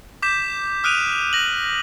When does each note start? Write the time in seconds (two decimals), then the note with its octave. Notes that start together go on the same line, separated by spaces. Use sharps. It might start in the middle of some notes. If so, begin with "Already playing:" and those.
0.22 D6 G6 B6 E7
0.84 D#6 F6 F#6 D7 D#7 F7
1.33 A#6 F#7